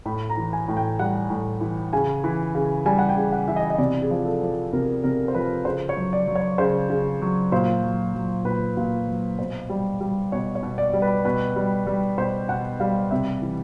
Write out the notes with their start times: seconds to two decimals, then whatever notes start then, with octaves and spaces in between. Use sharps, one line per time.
0.06 A2 B5
0.30 A#5
0.37 E3
0.53 G#5
0.68 A2
0.77 G5
0.99 G3 F#5
1.30 A2
1.61 E3
1.93 C#3 G#5
2.24 E3
2.55 C#3
2.86 G3 G#5
2.99 F#5
3.09 G5
3.16 C#3
3.32 F#5
3.48 E3 E5
3.56 D#5
3.70 D#5
3.79 C3 D5
4.02 G#4
4.10 F3
4.26 A4
4.42 F3
4.73 C3 A#4
5.04 C3 A#4
5.28 C5
5.34 F3 B4
5.65 C#3 C5
5.89 C#5
5.97 F#3
6.13 D5
6.28 F#3
6.35 C#5
6.58 C#3 C5
6.90 C#3
7.22 F#3
7.52 A#2 C5
7.83 F#3
8.14 F#3
8.45 A#2 B4
8.77 A#2
9.07 F#3
9.39 B2 C5
9.70 G3
10.01 G3
10.32 B2 C#5
10.55 C#5
10.63 B2
10.78 D5
10.93 G3
11.02 B4
11.25 B2 B4
11.56 G3
11.87 G3
12.18 B2 C5
12.49 B2 F#5
12.80 G3 F5
13.11 C3 E5
13.42 E3